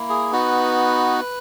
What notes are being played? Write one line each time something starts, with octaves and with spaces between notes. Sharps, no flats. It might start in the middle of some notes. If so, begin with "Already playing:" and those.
Already playing: A#3 E4
G#4
B3 D#4 F#4 B4